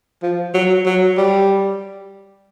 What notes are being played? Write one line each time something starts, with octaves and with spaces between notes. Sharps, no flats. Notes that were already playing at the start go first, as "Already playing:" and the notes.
F3
F#3
F#3
G3